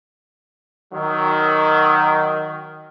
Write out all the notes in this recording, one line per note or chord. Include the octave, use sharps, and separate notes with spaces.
D#3 F#3